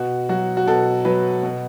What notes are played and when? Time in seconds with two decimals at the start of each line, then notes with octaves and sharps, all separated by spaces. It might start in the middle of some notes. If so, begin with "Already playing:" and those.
Already playing: B2 F#4
0.29 F#3 F#4
0.57 F#4
0.67 B2 A4
1.05 F#3 B4
1.43 B2